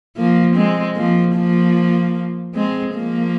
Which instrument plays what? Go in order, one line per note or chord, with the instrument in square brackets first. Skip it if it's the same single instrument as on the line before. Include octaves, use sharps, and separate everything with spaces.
[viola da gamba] F3 A#3
G#3 C4
F3 A#3
F3 A#3
G#3 C4
F3 A#3